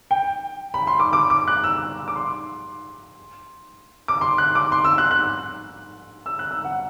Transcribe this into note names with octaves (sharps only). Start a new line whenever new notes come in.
G5
B5
C6
D6
D6
D6
F#6
E6
D6
C6
D6
C6
F#6
D6
C6
E6
F#6
F#6
E6
F#6
E6
F#5